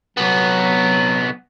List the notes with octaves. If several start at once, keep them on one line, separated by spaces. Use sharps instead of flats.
C2 F#3 B3